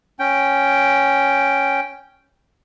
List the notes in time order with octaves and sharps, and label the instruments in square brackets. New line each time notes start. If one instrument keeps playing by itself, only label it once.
[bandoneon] C#4 G5